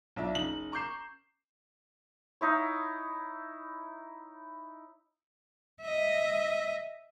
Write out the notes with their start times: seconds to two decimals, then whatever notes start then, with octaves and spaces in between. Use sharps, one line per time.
0.16 B1 D4 F4 E5
0.35 F#1 D#4 F#7
0.72 A#5 C#6 D6 G6 C7 E7
2.41 D#4 E4 C#5
5.82 D#5 E5